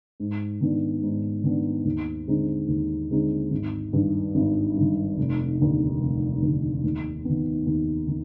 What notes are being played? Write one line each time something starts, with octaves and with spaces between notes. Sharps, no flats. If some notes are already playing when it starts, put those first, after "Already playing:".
G#2
D#3 B3 D4
G#2
D#3 B3 D4
D#2
D3 G#3 C4 D#4
D#2
D3 G#3 C4 D#4
G#1
G2 D#3
G#1
G2
D#3
F1
D#2 D3
F1
D#2 D3
D#2
D#3 B3
D#2
D#3